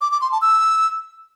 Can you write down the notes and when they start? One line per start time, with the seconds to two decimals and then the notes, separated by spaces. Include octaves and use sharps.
0.01 D6
0.11 D6
0.21 C6
0.31 A5
0.42 E6